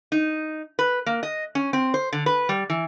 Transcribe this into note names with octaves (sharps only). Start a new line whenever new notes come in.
D#4
B4
A#3
D#5
C#4
C4
C5
D3
B4
G3
E3